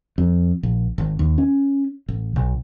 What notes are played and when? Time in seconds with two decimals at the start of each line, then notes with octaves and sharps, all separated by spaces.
0.18 F2
0.63 A#1
0.98 G#1
1.19 D#2
1.38 C#4
2.09 A1
2.36 B1